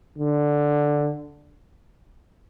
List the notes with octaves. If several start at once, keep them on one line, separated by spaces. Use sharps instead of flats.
D3